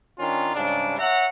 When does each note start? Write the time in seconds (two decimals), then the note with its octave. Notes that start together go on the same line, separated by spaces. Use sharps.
0.19 D#3 C#4 D4 F4
0.55 G#2 C#3 G3 D4
0.99 C#5 E5 F#5 A#5